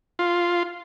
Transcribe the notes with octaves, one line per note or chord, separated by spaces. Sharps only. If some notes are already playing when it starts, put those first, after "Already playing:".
F4